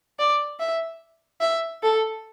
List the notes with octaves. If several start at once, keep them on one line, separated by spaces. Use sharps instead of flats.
D5
E5
E5
A4